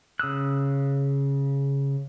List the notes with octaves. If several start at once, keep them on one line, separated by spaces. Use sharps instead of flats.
C#3 D#6 E6 F#6